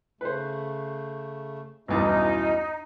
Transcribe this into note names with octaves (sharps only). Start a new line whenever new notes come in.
C#3 A3 B4 C5
B1 E2 G2 B2 C#4 D#4 E4 D#5